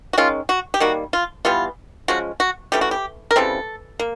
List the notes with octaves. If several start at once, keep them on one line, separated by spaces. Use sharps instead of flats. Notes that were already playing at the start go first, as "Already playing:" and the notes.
F#4
D#3 G#3 C#4 F4
F#4
G4
D#3 G3 A#3 F#4
F4
E3 G3 B3 F4
F3 G#3 C#4 F#4
F#4
E3 A3 C#4 G4
F#4
G4
A#4
C#3 E3 G3 C4 A4
A#3